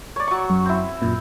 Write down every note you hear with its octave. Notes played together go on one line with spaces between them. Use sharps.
C#5 D5
F#3 C#6
F#2
C4 E4
F#2 A#2